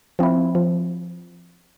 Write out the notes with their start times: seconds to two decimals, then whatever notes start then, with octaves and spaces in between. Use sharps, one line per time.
0.19 F3 C4 E4
0.55 F3